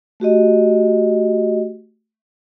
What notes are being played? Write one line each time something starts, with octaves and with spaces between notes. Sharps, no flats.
A3 F#4 G4 D#5